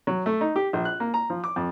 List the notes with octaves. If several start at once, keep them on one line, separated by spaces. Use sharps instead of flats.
F#3
A3
D#4
G4
A#1
F#6
A#3
A#5
F3
D6
F2